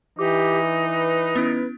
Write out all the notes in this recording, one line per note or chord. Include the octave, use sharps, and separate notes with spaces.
E3 D#4 G4 D6
B4
B3 C#4 E4